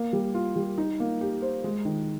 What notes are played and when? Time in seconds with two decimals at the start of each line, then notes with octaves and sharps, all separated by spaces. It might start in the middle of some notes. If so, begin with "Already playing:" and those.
Already playing: A#3
0.13 G3
0.34 F4
0.56 G3
0.78 D#4
1.00 A#3
1.21 G4
1.42 C5
1.64 G#3
1.85 D#3